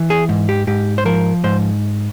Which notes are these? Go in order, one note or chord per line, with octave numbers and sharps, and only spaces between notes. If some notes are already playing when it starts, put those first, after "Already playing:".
Already playing: E3
G#4
G#2
G4
G#2 G4
C5
F3 A#4
G#2 C5